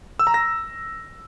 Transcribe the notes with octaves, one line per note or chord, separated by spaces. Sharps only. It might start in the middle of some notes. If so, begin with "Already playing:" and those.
E6
A#5
A#6